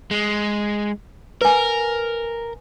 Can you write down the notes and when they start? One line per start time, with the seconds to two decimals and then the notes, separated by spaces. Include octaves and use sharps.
0.11 G#3
1.41 A#4 B4 G#5